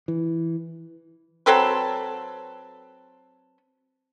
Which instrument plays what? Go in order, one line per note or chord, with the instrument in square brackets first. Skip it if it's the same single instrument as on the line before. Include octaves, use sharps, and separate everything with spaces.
[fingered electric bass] E3
[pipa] F#3 C4 A4 B4